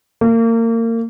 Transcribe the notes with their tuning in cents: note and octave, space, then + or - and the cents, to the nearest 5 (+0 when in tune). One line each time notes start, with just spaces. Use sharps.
A#3 -30